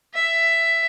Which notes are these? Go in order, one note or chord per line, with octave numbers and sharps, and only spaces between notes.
E5